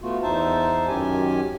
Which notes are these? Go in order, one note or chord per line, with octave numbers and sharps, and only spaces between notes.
A3 B3 F4 F#4
E2 D#4 C5 E5 A5
F#2 D#3 G4 G#5